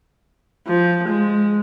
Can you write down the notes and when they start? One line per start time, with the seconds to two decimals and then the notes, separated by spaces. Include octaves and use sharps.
0.67 F3
1.08 G#3